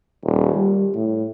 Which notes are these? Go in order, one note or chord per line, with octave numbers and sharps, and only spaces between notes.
D#1
G3
A2